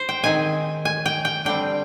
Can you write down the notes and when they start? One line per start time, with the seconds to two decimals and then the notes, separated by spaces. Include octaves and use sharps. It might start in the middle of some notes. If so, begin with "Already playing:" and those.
Already playing: C5
0.09 G5
0.24 D#3 G#3 C4 G#5
0.85 G#5
1.06 G5
1.25 G5
1.45 D3 G3 C4 G5